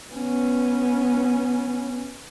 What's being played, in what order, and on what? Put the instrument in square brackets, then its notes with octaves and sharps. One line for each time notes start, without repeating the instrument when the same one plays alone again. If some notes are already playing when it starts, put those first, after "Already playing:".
[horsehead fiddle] B3 C#4